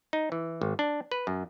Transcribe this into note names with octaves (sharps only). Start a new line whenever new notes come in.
D#4
E3
G#1
D4
B4
F#2